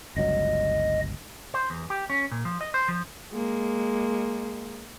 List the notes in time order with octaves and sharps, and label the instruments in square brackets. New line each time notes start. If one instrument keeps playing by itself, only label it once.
[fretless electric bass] G1 C#2 F#3 [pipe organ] D#5
[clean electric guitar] C5
E2
G4
C#4
A#2
F3
D#5
C5
F3
[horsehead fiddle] G#3 A#3